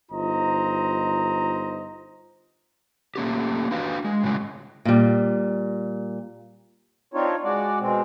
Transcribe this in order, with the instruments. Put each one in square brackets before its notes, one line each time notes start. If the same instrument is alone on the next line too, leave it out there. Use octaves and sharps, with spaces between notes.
[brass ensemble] G1 D#4 F4 C5 D#5 A#5
[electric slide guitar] A3 A#3 C#4 G4
D4 F#4 B4 F5
G#3
A2 C#3 F#3 G#3
[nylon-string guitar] A#2 G3
[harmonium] C4 D4 D#4 F4 C#5
G#3 F#4 D5
B2 G#3 C4